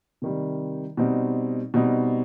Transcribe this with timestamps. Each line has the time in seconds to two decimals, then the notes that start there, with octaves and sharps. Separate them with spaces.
0.22 C3 D#3 G3
0.97 B2 G3 C4 D#4
1.74 B2 G3 C4 D#4